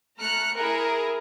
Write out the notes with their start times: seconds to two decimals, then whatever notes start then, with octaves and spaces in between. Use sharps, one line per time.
0.18 A3 A#5 F6 F#6 C#7
0.57 E4 G#4 A#4 A#5